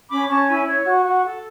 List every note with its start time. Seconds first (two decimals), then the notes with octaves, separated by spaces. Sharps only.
0.10 C#4 B5 D6
0.28 C#4 A5 C#6
0.42 C#6
0.47 E4 G#5 B5
0.67 C#5
0.85 F#4
1.04 F#4
1.24 A4